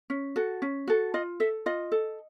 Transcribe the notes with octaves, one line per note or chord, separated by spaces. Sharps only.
C#4
F#4 A4
C#4
F#4 A4
F4 D#5
A4 E5
F4 D#5
A4